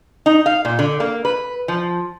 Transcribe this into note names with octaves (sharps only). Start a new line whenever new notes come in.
D#4
F5
A#2
D3
A#3
B4
F3